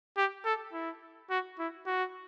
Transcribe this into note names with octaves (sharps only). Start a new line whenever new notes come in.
G4
A4
E4
F#4
E4
F#4